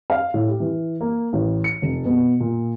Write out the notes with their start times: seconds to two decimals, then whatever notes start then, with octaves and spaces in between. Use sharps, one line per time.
0.10 F5
0.34 A2
0.47 G4
0.60 E3
1.01 A#3
1.33 A1
1.64 C#7
1.82 F1
2.05 B2
2.40 A#2